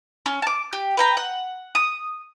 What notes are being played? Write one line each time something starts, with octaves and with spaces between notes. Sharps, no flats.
C#4
A5 D6
G4
B4 G5 A#5
F#5
D#6